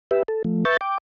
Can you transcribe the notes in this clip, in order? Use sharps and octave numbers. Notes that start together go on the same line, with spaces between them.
G4 B4 E5
A4
F3 A3
B4 E5 C#6 G6 A6
G5 D6